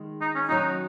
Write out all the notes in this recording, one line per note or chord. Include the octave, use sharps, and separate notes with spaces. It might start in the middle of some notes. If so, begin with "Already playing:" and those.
Already playing: D#3 G#3
D#4
C#4
D#3 F#3 C#4 D#4 F#4
D#4